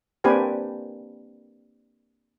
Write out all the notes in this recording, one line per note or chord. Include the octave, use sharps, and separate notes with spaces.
A#3 C4 D4 G4 B4 G#5